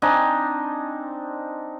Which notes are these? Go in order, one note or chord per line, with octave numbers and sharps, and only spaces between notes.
C4 D4 D#4 G#5